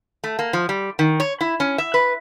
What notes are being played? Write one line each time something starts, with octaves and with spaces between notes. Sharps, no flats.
A3
A#3
F3
G3
D#3
C#5
E4
C#4
E5
B4